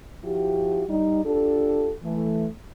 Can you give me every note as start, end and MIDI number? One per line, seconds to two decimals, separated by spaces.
0.24 0.83 53
0.24 0.83 64
0.24 0.83 66
0.24 0.83 67
0.89 1.20 55
0.89 1.20 63
1.24 1.91 62
1.24 1.91 65
1.24 1.91 67
1.24 1.91 69
2.03 2.47 52
2.03 2.47 57